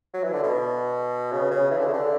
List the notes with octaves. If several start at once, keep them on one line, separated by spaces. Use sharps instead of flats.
F#3
E3
D3
B2
C#3
C#3
E3
D3
C#3
D3